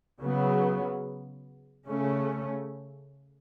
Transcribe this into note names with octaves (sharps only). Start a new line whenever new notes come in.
C#3 F#3 B3
C#3 A3 C#4